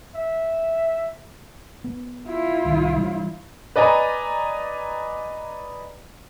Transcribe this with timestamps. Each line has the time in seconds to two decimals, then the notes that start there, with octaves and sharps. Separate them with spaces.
0.15 E5
1.84 B3
2.28 E4 F4
2.65 C2 D#3 G3
2.97 E3 G3 D4
3.76 B4 D5 D#5 G#5 A#5